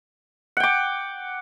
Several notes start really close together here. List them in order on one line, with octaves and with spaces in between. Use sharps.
F#5 G5 D6